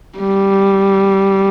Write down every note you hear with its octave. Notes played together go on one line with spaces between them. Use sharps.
G3